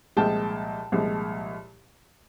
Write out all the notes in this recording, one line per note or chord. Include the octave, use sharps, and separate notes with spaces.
C2 A#2 F3 G#3 G5 A5
C2 A#2 F3 G#3